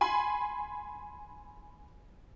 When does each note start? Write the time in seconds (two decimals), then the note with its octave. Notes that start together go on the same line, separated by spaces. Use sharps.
0.01 G#5 B5 C6